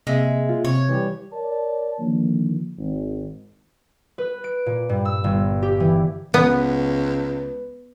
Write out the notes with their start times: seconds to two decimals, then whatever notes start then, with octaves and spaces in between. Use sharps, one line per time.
0.07 C3 G#3 A#3 E5
0.49 F4
0.65 C3 C#5
0.89 E3 G3 G4
1.33 A#4 C#5 D5 A5
1.99 D3 D#3 F3 A#3
2.78 G#1
4.18 B4
4.44 D7
4.66 A#2
4.89 G2
5.05 E6
5.24 G1
5.62 G4
5.80 E3
6.34 C#2 B3 B4